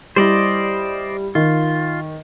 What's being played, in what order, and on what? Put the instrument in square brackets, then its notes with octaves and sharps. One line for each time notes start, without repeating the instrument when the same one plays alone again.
[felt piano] G3 E4 [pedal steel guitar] C5 D5 D#5
[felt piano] D#3 [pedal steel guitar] F4